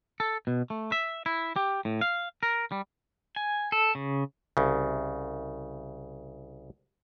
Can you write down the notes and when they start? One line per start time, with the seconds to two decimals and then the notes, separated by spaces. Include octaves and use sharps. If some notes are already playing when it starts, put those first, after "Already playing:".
0.20 A4
0.47 B2
0.70 A3
0.92 E5
1.26 E4
1.56 G4
1.85 A2
2.01 F5
2.43 A#4
2.72 G3
3.36 G#5
3.72 A4
3.95 C#3
4.57 C2 C#3